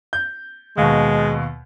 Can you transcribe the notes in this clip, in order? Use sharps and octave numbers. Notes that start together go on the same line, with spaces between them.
G6
D#2 B2 G#3